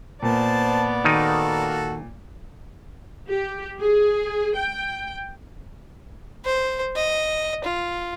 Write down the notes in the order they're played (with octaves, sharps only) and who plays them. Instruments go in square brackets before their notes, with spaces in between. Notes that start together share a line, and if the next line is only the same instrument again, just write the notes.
[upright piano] A#2 [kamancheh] B3 D5 [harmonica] C5 A5
[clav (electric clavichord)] D#3 D#4 [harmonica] A#3 F#4 A4
[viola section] G4
G#4
G5
[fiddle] C5
D#5
F4